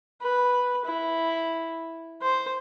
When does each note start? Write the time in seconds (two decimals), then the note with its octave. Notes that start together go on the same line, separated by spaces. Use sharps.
0.21 B4
0.85 E4
2.22 C5